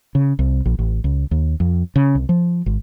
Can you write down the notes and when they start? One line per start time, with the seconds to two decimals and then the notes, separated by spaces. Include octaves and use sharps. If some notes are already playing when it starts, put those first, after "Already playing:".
0.15 C#3
0.39 C2
0.66 A#1
0.79 A1
1.04 C#2
1.31 D#2
1.60 F2
1.96 C#3
2.15 C2
2.29 F3
2.66 G#1